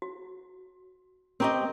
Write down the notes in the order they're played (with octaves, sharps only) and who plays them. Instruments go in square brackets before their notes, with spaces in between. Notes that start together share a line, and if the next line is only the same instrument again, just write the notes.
[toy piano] F#4
[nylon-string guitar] C4 G4 D#5 [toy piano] A#4 A#5 C#6